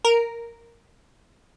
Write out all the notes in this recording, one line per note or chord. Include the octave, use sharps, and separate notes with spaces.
A#4